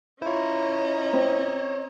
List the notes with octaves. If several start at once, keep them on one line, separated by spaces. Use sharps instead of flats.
C#4 E4 F4 C5 C#5 D#5 A#5
C4